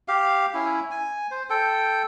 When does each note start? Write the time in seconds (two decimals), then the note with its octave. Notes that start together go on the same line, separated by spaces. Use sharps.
0.08 G4 F5
0.54 C#4 E4
0.91 G#5
1.31 C5
1.50 A4 G5